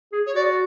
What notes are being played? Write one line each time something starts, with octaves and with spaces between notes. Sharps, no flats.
G#4
C#5
F#4 D5